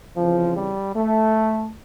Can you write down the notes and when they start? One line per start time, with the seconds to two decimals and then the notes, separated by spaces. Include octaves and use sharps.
0.16 F2 C#3 E3 F3
0.57 G3
0.96 A3